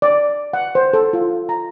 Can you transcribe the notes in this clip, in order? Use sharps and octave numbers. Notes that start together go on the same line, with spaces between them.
D5
F#5
C5
A4
F4
A#5